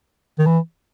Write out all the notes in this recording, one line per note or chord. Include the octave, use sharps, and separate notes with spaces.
D#3
E3